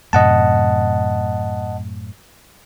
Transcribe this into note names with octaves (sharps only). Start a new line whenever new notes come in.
F#2 A2 C3 D#5 F#5 A5